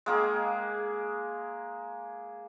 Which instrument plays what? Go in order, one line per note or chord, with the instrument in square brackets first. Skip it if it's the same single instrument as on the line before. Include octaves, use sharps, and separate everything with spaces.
[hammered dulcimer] G#3 A#3 G#4